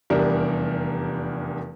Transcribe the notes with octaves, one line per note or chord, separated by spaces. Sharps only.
F1 E2 G3 D4 A#4